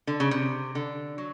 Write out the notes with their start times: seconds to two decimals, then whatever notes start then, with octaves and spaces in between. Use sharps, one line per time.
0.07 D3
0.20 C#3
0.31 C3
0.75 D3
1.18 F#3